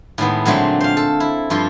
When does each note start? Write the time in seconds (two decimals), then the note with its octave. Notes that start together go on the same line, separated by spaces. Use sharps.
0.18 A2 D#3 G#3 B3
0.45 A#2 D3 F#3 G#3 A3 C4
0.81 C5 F5
0.97 A4
1.20 E4
1.50 G2 F3 F4 A4 C6